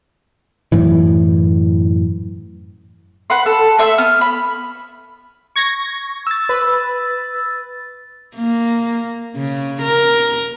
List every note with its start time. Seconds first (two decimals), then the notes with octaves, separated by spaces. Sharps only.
0.72 F#2 A2 E3
3.30 B4 F#5 B5 C6
3.46 A4
3.79 A3 E5 C6 E6
3.98 B3 F6
4.21 B5
5.56 C#6 G#6 A#6
6.27 E6 A6
6.49 B4
8.36 A#3
9.35 C#3
9.82 A#4